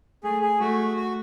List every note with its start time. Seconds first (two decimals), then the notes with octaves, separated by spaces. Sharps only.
0.23 A3 G#4
0.42 G#4
0.60 A3 F#4
0.97 F#4